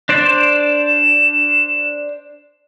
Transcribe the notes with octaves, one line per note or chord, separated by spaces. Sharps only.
D4 C5 D5 E7